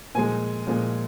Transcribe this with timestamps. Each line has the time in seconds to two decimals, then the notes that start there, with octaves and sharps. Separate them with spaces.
0.15 A#2 F3 G#3 G#5
0.67 A#2 F3 G#3